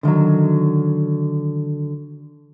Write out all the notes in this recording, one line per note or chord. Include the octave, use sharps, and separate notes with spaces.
D3 D#3 F3 F#3